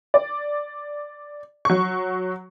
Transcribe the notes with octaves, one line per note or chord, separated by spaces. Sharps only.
D5
F#3 C#6